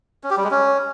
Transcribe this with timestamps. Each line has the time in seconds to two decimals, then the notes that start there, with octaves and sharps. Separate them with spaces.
0.24 C#4
0.30 G4
0.37 G3
0.44 G#3
0.51 C#4